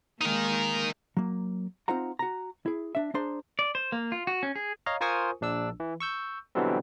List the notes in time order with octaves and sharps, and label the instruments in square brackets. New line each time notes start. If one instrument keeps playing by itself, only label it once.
[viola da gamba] G#3 A#3 [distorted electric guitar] D#4 A#4
[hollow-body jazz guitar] F#3 A#3
C4 D#4 F4 C5 F#5 A#5
F#4 A#5
E4 G#4
D4 E5
D4 G#4 C5 A#5 C6
[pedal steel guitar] D5
C5
A#3
F4
F#4
C#4
G#4
[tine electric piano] C#5 D#5 F5 A#5
F4 A#4 C5 G#5 C#6 D#6
A#1 D4 E6
E3
C#6 E6 G6
B2 D3 E3 F#3 G3 C4